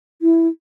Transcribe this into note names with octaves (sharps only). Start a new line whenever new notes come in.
E4